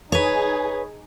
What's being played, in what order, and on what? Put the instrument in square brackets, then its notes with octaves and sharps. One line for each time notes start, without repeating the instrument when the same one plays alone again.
[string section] D#4 G#4 [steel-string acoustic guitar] B4 C#5